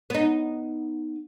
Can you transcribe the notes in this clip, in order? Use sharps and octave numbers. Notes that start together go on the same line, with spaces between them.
B3 D#4